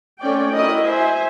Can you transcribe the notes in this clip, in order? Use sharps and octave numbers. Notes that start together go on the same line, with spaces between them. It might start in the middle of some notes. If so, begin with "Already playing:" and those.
A3 C4 C#4 C#5 D5 G5
E4 F#4 A#4 D#5
C5 E5 G#5